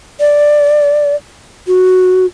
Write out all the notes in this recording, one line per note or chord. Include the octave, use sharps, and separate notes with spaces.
D5
F#4